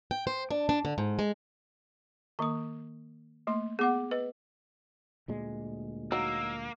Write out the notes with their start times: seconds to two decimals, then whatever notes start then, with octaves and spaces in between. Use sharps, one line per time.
0.11 G5
0.27 C5
0.51 D4
0.69 D4
0.85 D3
0.98 G#2
1.19 G#3
2.39 D#3 A#3 C#6 D#6
3.47 A3 A#3 C6
3.79 B3 G#4 F#5 D6
4.11 B4 D#5
5.28 D2 A#2 G#3
6.12 F#3 A#3 D#4 E6